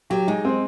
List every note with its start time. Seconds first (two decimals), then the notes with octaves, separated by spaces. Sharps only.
0.10 F#3 G4
0.28 G#3 D#4
0.45 C4